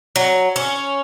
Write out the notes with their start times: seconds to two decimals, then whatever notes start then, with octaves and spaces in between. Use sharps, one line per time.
0.16 F#3
0.56 C#4